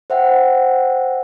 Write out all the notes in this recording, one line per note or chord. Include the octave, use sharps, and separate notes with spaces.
C5 E5 F#5 G5